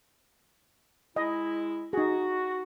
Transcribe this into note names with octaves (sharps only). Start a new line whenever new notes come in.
G#3 E4 D#5
D#4 F#4 G#4